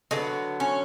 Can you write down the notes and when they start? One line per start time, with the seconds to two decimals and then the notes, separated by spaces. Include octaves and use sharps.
0.11 D3 F#3 B3 D#4
0.60 C#4